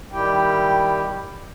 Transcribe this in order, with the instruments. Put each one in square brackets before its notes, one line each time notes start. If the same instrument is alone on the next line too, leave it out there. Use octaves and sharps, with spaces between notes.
[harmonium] D#3 G3 E4 G4 G5